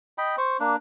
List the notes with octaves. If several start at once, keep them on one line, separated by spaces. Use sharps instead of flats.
D#5 G5 B5
C5 C#6
A#3 D4